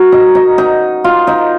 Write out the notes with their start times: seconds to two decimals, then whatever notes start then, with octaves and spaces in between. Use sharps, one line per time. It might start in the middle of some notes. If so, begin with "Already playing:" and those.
Already playing: F#4 A#4
0.12 D#4
0.35 D#4
0.58 D#4
1.04 F4
1.27 D#4